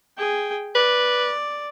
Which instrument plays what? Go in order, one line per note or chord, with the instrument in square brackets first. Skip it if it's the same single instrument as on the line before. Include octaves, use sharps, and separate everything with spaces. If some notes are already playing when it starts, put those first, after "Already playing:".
[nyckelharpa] G#4 G5
[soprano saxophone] B4 [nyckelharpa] D5